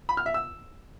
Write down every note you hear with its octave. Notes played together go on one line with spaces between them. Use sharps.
B5
F6
E5
E6